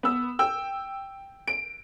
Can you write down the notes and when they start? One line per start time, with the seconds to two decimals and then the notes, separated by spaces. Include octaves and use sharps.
0.03 B3 E6
0.39 G5 E6
1.47 D7